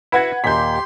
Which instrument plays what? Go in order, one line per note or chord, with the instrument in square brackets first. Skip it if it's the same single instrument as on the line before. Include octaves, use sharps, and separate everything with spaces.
[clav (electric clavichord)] E4 F#4 [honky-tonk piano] B4 F#5 G#6
[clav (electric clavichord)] D#2 A#2 [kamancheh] G4 C6 [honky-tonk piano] G6 B6